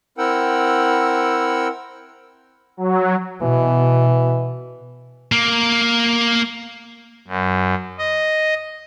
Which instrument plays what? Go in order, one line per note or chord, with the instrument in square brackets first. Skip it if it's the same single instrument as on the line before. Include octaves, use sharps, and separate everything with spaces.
[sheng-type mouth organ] C4 E4 A#4 F#5 G5 E6
[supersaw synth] F#3
[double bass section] B2 [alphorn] E3
[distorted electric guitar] A#3
[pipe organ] F#2
D#5